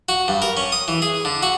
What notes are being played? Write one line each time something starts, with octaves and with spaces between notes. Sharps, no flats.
F#4
G2
A#4
C#4
D#6
E3
G#4
D3
F#4